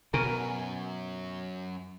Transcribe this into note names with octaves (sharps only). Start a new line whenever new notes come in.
F#2 B2 A#4 G#5